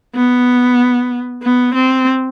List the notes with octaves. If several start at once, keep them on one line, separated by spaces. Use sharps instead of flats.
B3
B3
C4